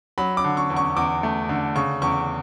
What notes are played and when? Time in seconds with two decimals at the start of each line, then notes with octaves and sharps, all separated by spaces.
0.18 F#3 B5
0.37 D6
0.44 D3
0.57 C#6
0.70 E2
0.76 C#6
0.97 E2 D6
1.23 A3
1.49 D3
1.76 C#3 C#6
2.02 E2 C#6